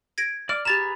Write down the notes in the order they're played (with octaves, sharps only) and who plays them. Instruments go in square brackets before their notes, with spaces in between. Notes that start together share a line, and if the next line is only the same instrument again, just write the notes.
[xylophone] G#6 A#6 D7
[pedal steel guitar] D5 D6 [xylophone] F6
[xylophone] G4 A6 E7 [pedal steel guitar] G#4 B4 A#5